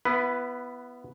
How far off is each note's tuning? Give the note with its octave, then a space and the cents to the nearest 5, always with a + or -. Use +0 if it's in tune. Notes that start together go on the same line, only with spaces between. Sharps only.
B3 +0 E4 +30 B4 +0